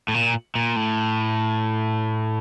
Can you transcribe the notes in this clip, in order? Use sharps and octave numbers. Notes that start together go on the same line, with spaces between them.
A2
A#2
A#2
A2